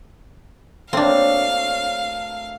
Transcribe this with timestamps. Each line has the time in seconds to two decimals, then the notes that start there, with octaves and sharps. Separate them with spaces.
0.93 F#3 A3 A#3 C4 D4 F5